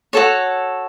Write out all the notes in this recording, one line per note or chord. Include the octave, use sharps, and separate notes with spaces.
F#4 A4 C#5